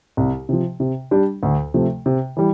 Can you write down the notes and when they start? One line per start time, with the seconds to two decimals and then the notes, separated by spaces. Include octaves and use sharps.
0.17 C2
0.49 C3 F3
0.80 C3
1.11 G3 D4 G4
1.43 D2
1.74 C3 F3 A3
2.06 C3
2.37 E3 G3